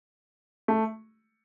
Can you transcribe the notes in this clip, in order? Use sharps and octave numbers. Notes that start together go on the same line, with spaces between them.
A3